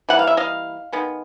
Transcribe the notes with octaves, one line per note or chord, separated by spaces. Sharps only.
E3 G3 A#3 F#5
F5
E5
D#5 F5
D#3 G#3 B3